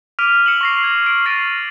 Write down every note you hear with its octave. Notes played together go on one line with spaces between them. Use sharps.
D6 F6 B6 D7 D#7 F7
E6 C#7 E7 F#7
C#6 A#6 C7
G#6
C7 D7 F#7
F6 A6 A#6 C7 D7 D#7